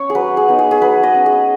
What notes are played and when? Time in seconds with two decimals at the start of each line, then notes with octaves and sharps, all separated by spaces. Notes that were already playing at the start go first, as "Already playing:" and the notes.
Already playing: C#4 C#5
0.10 G#4
0.15 F#3 B4
0.37 G#4
0.48 B3 D#4
0.59 G#4
0.71 G#4
0.81 F#3 B4
1.03 D#5
1.14 C#4
1.26 G#4